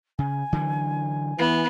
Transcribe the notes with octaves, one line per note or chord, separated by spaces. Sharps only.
C#3 G#5
D3 E3 F#3
E3 B3